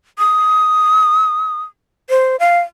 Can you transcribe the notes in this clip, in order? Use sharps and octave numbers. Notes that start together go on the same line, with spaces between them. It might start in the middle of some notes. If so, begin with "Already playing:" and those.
D#6
C5
F5